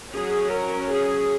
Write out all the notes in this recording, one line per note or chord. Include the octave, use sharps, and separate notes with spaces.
F#3 C#4 G#4
A#4
G#4